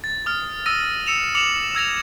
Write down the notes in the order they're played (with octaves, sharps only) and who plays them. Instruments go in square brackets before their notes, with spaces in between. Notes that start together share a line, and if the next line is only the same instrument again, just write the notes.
[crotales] A6
D#6 F6
D#6 E6 A#6 D#7
E6 C#7 E7 F7
D6 C#7 F7 F#7
E6 G#6 A#6 F7